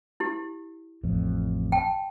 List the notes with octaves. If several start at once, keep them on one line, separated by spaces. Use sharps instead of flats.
E4 G4
A1 F2
G5 A5